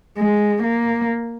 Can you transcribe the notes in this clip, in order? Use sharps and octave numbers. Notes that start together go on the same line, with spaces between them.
G#3
A#3